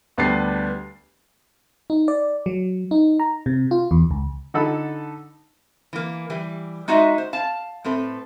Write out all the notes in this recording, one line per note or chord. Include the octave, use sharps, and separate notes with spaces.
D2 G3 B3 D4 A6 C7
D#4
D5
F#3
D#4
A#5
C3
F4
E2
C#2
D3 D#4 A4 F#5 B5
E3 A#3
E3 G3 G4
G#3 D#4 F#4 D#5 E5
C5
F5 A5
A2 C4 A4 B4